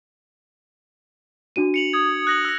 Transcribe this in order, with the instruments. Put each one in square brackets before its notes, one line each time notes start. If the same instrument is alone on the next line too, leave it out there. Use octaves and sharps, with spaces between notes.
[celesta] D4 F#4 D#7
[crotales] C#7 F7 F#7
[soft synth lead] D#6 [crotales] G#6
[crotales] F#6 A#6 F#7
E6 A#6